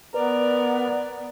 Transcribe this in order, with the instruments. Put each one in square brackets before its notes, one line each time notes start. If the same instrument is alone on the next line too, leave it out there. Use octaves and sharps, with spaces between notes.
[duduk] B3 [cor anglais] A#4 [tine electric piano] B4 [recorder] D5